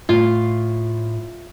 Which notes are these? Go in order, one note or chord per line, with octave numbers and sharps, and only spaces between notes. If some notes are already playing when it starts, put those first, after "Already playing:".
A2 F4